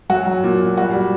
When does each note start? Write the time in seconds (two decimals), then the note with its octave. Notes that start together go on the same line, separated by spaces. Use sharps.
0.09 F#3 F#4
0.27 F#3
0.44 A#2
0.60 A#2
0.78 G3 F#4
0.93 G3